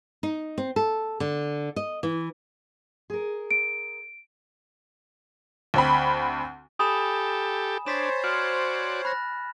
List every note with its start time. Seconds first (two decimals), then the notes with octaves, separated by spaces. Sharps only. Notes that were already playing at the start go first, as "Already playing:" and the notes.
0.23 D#4
0.58 C4
0.76 A4
1.20 D3
1.76 D#5
2.03 E3
3.10 G#4 A#4
3.51 D7
5.74 D2 C4 B5
6.79 G4 A4 G#5 B5 D#6 E7
7.86 D4 C5 C#5 A6 B6 E7
8.24 F#4 D5 F6
9.05 B5 F#6 A#6